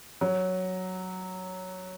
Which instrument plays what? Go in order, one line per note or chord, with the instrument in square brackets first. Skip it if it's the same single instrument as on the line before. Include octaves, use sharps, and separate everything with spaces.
[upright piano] F#3